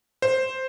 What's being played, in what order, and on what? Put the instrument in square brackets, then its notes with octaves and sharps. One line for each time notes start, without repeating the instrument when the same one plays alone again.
[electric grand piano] C5